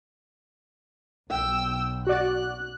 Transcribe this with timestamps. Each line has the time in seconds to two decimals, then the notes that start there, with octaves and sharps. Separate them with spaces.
1.30 B1 G5 E6
2.07 F#4 D5 F#6